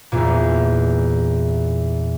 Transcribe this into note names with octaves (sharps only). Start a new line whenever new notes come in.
E2 A#2